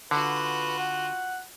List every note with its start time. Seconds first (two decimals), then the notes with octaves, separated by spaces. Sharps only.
0.11 D3 F4 F#4 B4
0.78 F#5